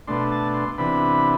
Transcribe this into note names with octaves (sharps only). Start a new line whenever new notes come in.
B2 A3 D4 C6
A5
C6
C3 E3 B3 D4 B5